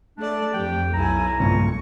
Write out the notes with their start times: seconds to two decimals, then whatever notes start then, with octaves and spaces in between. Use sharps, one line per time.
0.17 A3 D4 A4 D5
0.54 F2 G4 G5
0.94 B1 E4 G#5 A#5
1.40 C#2 G2 A#2 C#6